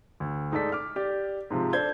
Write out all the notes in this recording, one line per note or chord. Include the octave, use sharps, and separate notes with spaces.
D2
G#2 D#4 A4 D5 B6
D6 F6
G4 D5
G#2 C3 F3
D4 A4 C5 G6 G#6 G7